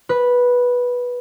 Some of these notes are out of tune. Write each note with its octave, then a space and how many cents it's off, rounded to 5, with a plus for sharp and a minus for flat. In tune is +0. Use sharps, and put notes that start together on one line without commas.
B4 -10